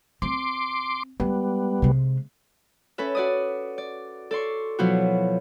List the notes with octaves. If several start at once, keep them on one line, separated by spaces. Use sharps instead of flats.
C4 C6 D6
G3 G#3 B3
C3 G#3
C#4 A4 B4 E5
F#4 D5 D#6
D5
A4 D5 C6 C#6
B2 F3 F#3 E4 F#4